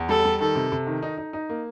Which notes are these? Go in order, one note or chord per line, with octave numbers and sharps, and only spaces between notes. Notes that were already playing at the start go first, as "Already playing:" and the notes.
Already playing: E2
G3 A4
G3
D#3 A4
C3
C3
D#3
D#4
D#4
D#4
A#3